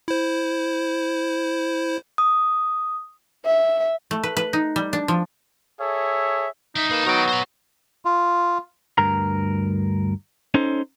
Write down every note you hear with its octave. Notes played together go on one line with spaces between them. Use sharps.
E4 C5
D#6
E5
A3
B4
B4
D#4
G3
D4
F3
G#4 A4 C#5 E5
G3 D#4 E5
A#3 G#4 B4 A5
F#3 B3 F#4 A#4 G5
C5 A#5
F4
D2 G2 A#4 A#5
C#4 D#4 A4 C5